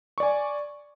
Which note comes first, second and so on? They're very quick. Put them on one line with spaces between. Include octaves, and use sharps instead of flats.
C#6 D5 G#5